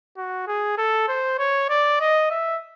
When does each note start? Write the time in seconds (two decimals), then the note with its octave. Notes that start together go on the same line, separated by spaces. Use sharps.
0.17 F#4
0.47 G#4
0.78 A4
1.08 C5
1.39 C#5
1.69 D5
2.00 D#5
2.31 E5